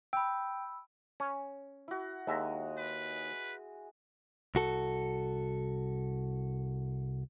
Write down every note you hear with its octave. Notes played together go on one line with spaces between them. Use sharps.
G5 B5 E6
C#4
E4 F#4
D#2 G#3 E5 A#5
B4
C2 F#4 A4